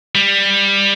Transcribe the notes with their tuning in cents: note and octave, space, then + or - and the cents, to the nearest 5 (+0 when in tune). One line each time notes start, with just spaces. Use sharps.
G3 +15